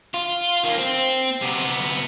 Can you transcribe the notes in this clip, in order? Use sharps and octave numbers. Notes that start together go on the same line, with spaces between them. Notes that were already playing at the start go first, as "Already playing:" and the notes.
F4
D#3 A#3
C4
C3 B3